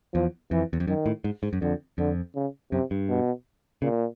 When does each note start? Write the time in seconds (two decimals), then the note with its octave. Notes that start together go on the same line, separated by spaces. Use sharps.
0.14 E2 F3
0.51 F2 E3
0.73 E2
0.80 F2
0.87 F#2 D#3
1.06 A2
1.24 G#2
1.43 G#2
1.53 F#2
1.61 F2 D3
1.98 F2 D3
2.35 C#3
2.72 F#2 C3
2.91 G2
3.09 B2
3.82 A#2 C#3